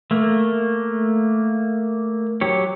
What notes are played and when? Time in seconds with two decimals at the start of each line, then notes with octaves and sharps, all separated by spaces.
0.11 A3 A#3
2.41 F#3 G4 C#5